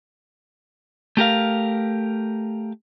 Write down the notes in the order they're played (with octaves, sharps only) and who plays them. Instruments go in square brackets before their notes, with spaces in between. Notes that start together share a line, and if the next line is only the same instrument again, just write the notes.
[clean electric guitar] A3 G4 A#4 F5